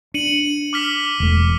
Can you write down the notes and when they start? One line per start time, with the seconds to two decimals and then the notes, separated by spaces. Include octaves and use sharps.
0.14 D4 C#7 D#7 F#7
0.73 D6 F6 B6
1.20 E1 A3